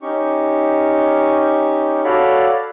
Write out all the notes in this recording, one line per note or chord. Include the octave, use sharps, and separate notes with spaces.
C#4 D#4 G4 C#6
F#4 A4 C#5 D5 F5 B5